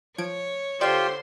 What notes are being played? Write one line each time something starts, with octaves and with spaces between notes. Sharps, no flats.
F3 C#5 G#6 D7
D3 F4 G4 C5 D5 C6 E7